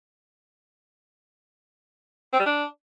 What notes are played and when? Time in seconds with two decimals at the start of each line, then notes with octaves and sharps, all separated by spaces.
2.33 C4
2.40 G3
2.46 D4